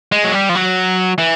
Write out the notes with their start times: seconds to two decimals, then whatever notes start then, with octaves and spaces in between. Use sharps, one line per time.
0.12 G#3
0.24 F#3
0.33 G3
0.49 F3
0.55 F#3
1.18 E3